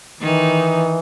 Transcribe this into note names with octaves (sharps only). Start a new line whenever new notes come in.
D#3 E3 D#4